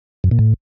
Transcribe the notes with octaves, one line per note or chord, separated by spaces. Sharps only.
F#2
A#2
A2